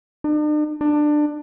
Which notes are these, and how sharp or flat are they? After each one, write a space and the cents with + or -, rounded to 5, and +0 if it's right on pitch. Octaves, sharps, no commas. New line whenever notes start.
D4 +45
D4 +20